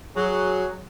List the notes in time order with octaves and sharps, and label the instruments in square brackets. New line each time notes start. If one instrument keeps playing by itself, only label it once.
[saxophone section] F#3 G#4